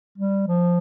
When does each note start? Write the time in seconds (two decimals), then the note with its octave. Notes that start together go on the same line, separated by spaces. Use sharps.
0.18 G3
0.47 F3